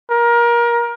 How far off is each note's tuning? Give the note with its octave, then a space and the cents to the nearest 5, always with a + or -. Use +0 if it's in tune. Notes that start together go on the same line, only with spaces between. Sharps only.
A#4 +25